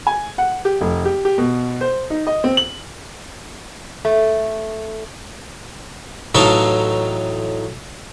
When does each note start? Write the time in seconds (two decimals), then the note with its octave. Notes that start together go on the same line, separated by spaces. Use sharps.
0.07 G#5
0.38 F#5
0.65 G4
0.81 F1
1.05 G4
1.25 G4
1.38 B2
1.81 C5
2.10 D#4
2.27 D#5
2.44 C4
2.57 F#7
4.05 A3
6.35 A1 F#3 D#4 A4 F5 C#6